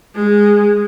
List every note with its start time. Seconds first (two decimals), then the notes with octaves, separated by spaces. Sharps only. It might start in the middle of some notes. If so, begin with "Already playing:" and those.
0.15 G#3